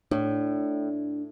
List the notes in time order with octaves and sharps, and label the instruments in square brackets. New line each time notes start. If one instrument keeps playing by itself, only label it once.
[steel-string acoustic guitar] A2 [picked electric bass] D4